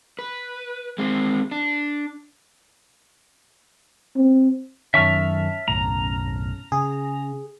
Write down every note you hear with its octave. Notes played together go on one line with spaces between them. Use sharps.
B4
G#3 C4
D4
C4
F#2 D#3 C#4 E5 A5 C#6 F6
F#1 B1 A2 A#5
C#3 G#4